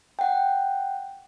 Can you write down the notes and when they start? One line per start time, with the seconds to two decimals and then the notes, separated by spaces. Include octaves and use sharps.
0.19 F#5 G5